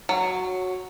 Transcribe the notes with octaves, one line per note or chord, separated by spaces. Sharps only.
F#3